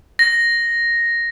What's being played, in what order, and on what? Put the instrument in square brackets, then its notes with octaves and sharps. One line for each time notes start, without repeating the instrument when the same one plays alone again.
[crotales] A#6